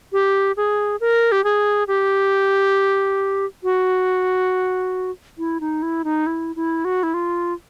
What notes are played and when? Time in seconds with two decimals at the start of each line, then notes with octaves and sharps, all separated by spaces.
0.12 G4
0.57 G#4
1.00 A#4
1.32 G4
1.44 G#4
1.88 G4
3.63 F#4
5.38 E4
5.61 D#4
5.82 E4
6.04 D#4
6.27 E4
6.56 E4
6.85 F#4
7.03 E4
7.14 F4